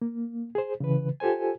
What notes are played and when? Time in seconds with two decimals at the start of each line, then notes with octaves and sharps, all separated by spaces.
0.02 A#3
0.55 G#4 C5
0.80 C#3 E3 B4
1.20 F4 G4 A4 C5 G#5